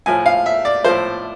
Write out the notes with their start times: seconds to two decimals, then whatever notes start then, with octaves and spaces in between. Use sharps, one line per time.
0.06 A2 F3 G#5
0.26 F5
0.46 E5
0.65 D5
0.84 A2 F3 C5